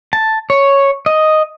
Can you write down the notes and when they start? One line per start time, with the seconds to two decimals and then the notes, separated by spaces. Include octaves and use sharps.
0.13 A5
0.50 C#5
1.06 D#5